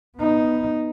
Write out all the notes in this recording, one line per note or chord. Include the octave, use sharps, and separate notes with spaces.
B3 D#4